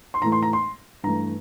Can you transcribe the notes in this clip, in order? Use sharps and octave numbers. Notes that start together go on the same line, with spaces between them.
C6
A2 E3 A3 A#5
C6
A#5
C6
G2 E3 A3 A#5